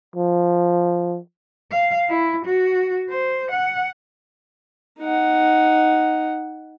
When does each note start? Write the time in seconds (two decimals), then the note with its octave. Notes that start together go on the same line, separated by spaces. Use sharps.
0.16 F3
1.71 F5
2.09 E4
2.46 F#4
3.10 C5
3.51 F#5
5.00 D#4 F#5